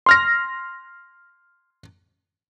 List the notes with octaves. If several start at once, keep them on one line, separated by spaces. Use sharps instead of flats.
C6 F6 A#6